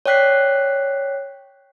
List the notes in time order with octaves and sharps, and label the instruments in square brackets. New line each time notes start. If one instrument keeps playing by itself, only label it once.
[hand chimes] C#5 D5 G5 F#6 B6 C7